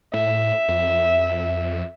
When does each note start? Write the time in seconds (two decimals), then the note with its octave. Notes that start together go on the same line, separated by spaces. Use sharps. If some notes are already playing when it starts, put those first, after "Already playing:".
0.14 A2 E5
0.68 F2